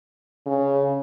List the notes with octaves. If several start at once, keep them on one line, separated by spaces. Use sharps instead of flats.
C#3